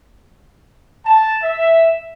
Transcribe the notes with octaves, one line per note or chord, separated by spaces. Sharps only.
A5
E5